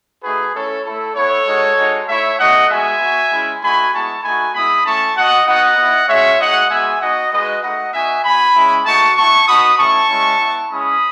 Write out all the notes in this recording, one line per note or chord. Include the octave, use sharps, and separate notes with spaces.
A3 D#4 F#4 G#4 B4
A3 C#4 E4 A4 C#5
A3 E4 A4
B3 E4 A4 C#5
G#3 D#4 F#4
G#3 D#4 F#4
A3 E4 C#5 E5
A3 D#4 F#4 D#5 F#5
G#3 B3 F#4 E5 G#5
B3 F#4
G#3 C#4 E4
A3 D#4 F#4 G#5 B5
G#3 B3 E4 A5 C#6
A3 D#4 F#4 G#5 B5
G#3 B3 E4 B5 D#6
A3 C#4 E4 A5 C#6
B3 F#4 D#5 F#5
B3 D#4 F#4 D#5 F#5
B3 E4
G#3 C#4 F#4 C#5 E5
G#3 D#4 F#4 D#5 F#5
G#3 B3 F#4 E5 G#5
B3 D#4 F#4 D#5 F#5
G#3 D#4 F#4 B4 D#5
A3 D#4 F#4 D#5 F#5
B3 D#4 F#4 E5 G#5
B3 F#4 G#5 B5
G#3 C#4 E4
A3 D#4 F#4 A5 C#6
B3 E4 A5 C#6
B3 D#4 F#4 B5 D#6
A3 C#4 E4 A5 C#6
G#3 C#4 E4
B3 E4
G#3 C#4 E4 B5 D#6